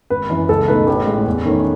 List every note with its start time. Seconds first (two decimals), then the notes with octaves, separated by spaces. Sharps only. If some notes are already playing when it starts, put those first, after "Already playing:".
0.10 G#1 B4
0.30 F#2 E3
0.49 C#2 A4
0.68 B2 A3 D#4 B4
0.87 A1
1.07 A2 G#3
1.26 E2
1.45 D#3 A3 C#4